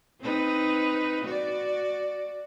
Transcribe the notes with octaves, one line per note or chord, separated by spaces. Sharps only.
C4 D#4 B4
F#4 D5